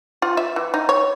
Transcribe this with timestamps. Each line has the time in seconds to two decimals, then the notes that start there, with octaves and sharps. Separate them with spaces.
0.22 F4
0.37 E5
0.56 E3
0.74 D#4
0.89 C#5